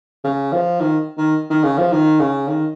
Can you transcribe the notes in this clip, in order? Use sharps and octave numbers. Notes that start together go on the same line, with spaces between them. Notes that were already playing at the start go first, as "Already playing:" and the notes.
C#3
F3
D#3
D#3
D#3
C#3
F3
D#3
C#3
D#3